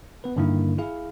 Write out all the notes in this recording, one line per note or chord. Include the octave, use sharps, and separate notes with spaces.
B3 B4
G2 D3 D#3 A#3 D4 E4
E4 G#4 F5